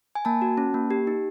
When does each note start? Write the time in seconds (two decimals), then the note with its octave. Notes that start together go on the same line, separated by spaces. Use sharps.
0.15 G#5
0.25 A#3 A5
0.42 F#4
0.57 C#4
0.74 A#3
0.91 G4
1.07 D#4